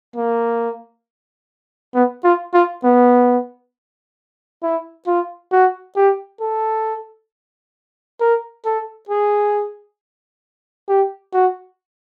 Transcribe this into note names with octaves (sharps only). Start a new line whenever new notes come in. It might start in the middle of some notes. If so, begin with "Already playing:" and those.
A#3
B3
F4
F4
B3
E4
F4
F#4
G4
A4
A#4
A4
G#4
G4
F#4